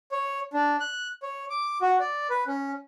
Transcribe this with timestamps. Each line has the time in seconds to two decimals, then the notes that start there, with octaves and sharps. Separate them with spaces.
0.12 C#5
0.53 D4
0.80 F#6
1.23 C#5
1.50 D6
1.82 F#4
2.00 D5
2.30 B4
2.47 C#4